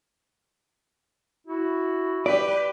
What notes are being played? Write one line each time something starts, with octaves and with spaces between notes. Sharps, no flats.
E4 F#4
G4 B4 D5